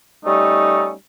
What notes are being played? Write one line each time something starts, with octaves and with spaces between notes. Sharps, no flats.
G3 A3 C#4 D#4